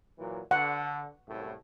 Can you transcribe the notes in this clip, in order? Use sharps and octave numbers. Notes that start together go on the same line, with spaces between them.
A#2 E3 F#3
D3 F#5
C2 F#2 A2